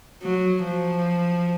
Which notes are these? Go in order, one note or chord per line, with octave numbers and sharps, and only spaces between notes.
F#3
F3